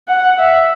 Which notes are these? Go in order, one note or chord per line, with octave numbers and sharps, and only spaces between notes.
F#5
E5